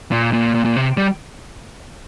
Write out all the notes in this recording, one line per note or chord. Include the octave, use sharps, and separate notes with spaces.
A#2
A#2
A#2
A#2
C3
G3